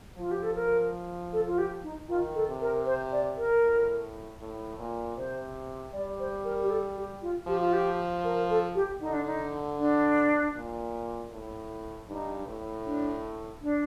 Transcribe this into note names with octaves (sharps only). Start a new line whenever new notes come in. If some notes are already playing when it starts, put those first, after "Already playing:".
F3 F4
G4
A4
A#4
A4
F4
G4
D#4
D#3 F4
A4
C3
A#4
C5
D5
A#4
A2
A2
A#2
C3 C5
G3 D5
C5
A#4
G4
A4
G4
F4
F3 G4
F4
G4
A#4
A4
G4
D3 D#4
D4
D#4
D4
A#2
A2
G2 D#4
A2
D4
D4